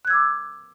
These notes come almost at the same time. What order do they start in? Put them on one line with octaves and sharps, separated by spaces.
F#6 G#6 E6 D6